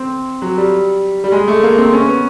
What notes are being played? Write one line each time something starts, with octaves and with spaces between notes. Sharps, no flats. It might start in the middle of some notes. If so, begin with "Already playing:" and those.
Already playing: C4
F#3
G3
G3
G#3
A3
A#3
C4
C#4
B3